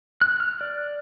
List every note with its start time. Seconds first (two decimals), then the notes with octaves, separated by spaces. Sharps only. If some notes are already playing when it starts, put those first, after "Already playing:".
0.21 F#6
0.40 F6
0.61 D5